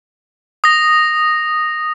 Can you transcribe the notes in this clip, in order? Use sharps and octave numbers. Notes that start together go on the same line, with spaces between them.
D#6 A#6